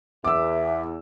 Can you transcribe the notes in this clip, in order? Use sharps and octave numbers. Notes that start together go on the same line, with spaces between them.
E2 E5 D6 E6